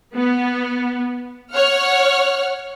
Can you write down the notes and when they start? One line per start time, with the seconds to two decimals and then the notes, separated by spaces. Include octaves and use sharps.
0.14 B3
1.53 C#5 F#5 F6